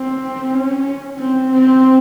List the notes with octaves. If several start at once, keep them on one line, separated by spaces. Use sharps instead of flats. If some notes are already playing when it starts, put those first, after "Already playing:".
Already playing: C4
C#4
C4
C4